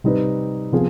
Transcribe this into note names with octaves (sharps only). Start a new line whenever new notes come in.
C3 G3 C4 D#4 B4
C3 F3 B3 F4 G#4